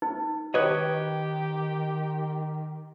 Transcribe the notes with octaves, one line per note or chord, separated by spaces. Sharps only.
D#4
D#3 G4 B4 C#5 D#5